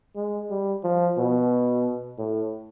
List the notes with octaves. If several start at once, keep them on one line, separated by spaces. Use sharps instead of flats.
G#3
G3
F3
B2
A2